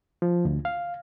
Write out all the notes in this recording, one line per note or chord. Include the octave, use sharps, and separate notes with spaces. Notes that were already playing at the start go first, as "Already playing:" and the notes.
F3
D2
F5